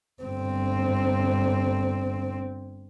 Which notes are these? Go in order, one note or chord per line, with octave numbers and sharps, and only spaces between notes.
G1 C4